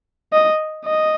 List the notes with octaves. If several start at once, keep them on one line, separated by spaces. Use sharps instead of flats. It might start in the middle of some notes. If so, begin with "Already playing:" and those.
D#5
D#5